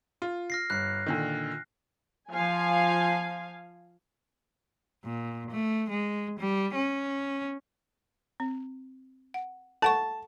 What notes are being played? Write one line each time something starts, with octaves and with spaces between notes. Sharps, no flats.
F4
F6 A#6 C7
G1 F#6 C7
A#2 D3 D#3
F3 F5 G#5
A#2
A3
G#3
G3
C#4
C4
F#5
A4 F#5 A5 C#6